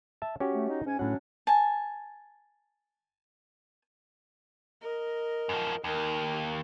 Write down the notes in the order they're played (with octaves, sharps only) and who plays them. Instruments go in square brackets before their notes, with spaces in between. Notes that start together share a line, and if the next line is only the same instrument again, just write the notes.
[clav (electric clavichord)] E5 A5
C#4 F#4 G4
[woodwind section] A3
D#4
G#2 C#4 G#5
[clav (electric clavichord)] A2 F#5 [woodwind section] F#3 C#4 D4
[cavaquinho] G#5 A5
[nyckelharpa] A#4 D#5
[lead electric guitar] F#2 F3
[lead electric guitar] D#2 [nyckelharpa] D#4 A#4